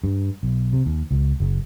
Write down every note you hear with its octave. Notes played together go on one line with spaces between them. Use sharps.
G2
B1
C3
D#2
C#2
F#1